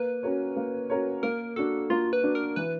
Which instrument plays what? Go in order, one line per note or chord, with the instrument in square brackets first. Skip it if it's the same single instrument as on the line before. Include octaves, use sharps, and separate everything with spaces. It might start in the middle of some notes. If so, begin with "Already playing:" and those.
Already playing: [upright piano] A#3 [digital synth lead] B4
[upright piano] C#4 F#4 A#4 C#5
A#3
C#4 F#4 A#4 C#5
[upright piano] A#3 [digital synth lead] A#4
[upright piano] D4 F#4 [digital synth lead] A4
[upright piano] A#3 [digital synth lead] F4
[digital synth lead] B4
[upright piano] D4 F#4
[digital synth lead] A#4
[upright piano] E3 [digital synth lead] B4